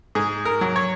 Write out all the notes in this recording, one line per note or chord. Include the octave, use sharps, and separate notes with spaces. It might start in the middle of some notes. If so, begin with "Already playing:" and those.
G#2 G#4
A#4
F#3
C#5